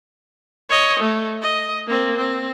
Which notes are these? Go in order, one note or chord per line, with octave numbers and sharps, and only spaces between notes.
C#5 D#5
A3
D#5
A#3 C4
C4